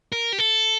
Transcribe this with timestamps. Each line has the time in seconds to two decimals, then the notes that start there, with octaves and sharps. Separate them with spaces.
0.12 A#4
0.33 G4
0.38 A4